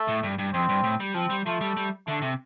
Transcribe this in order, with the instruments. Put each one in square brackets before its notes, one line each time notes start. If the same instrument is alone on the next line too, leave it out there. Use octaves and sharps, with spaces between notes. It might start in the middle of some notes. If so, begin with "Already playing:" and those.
Already playing: [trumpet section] A3
[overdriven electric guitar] A2
G2
G2
[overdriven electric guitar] F2 [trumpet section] C4
[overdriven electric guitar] G2
A2
G3
[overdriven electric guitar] F3 [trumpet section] C4
[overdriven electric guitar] G3
[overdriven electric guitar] F3 [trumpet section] A3
[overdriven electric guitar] G3
G3
[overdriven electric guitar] D3 [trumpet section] A3
[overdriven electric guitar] C3